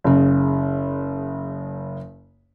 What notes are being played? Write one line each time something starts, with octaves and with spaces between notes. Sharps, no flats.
F#1 C#3